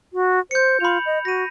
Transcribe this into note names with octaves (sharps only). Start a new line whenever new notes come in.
F#4
C5 G6 C#7
F4 B5 F7
D#5
F#4 A#6 D#7